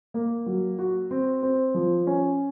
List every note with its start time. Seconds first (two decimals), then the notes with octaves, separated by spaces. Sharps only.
0.14 A#3
0.46 F#3
0.79 F#4
1.11 C4
1.43 C4
1.74 F3
2.07 C#4